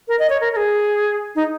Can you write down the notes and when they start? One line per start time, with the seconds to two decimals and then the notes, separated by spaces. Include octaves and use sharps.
0.08 A#4
0.19 D#5
0.30 C#5
0.41 A#4
0.53 A#4
0.57 G#4
1.36 D#4